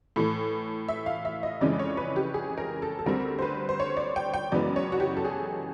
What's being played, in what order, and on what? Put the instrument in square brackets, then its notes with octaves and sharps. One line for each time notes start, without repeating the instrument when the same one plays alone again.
[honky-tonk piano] A2 E3 A3
E5
F5
E5
D#5
F2 C#3 E3 G#3 C#4 D5
C#5
B4
G4
G#4
A#4
A4
A4
D2 D3 G3 C4 A#4
C5
B4
C5
C#5
D5
G5
G5
F#2 C#3 E3 G#3 B3 D5
C#5
F#4
G4
A4
G#4